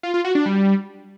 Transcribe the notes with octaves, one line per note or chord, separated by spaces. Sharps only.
F4
F4
F#4
D4
G3